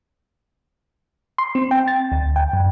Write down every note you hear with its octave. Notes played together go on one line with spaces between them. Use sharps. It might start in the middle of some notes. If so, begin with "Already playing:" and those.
C6
C4
G5
A6
D2
G5
F#2